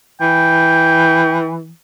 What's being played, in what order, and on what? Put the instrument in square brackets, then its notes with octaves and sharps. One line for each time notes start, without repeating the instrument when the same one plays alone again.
[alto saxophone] E3 [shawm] G5